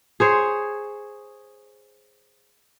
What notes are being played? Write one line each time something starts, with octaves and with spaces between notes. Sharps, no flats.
G#4 C5 C#5